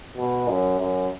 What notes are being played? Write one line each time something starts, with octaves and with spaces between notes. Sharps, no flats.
B2
F#2
F#2